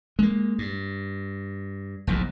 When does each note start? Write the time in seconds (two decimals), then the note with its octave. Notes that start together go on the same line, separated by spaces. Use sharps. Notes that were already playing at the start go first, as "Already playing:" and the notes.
0.19 G#3 A#3
0.58 G2
2.07 F1 B1 E2 G#2